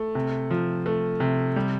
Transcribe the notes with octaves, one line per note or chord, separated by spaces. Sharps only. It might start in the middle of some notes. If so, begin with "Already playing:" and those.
Already playing: A3
C3
F3
A3
C3
G3